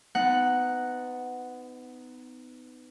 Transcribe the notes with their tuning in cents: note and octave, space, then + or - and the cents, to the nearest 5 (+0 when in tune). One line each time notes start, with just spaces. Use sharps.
B3 +30 D#4 -5 F#5 +0